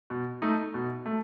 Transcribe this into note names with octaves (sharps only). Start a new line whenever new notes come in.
B2
A3 D#4
B2
A3